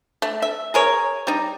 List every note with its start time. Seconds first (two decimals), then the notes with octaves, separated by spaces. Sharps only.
0.22 A3
0.42 E5
0.74 G#4 A#4 C#5
1.27 G3 D#4